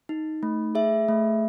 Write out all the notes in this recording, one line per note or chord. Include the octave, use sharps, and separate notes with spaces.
D#4
A3
G#4 E5
A3